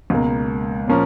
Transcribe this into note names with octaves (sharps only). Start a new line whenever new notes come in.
C#2 B2 A#3
A#2 F3 A#3 C#4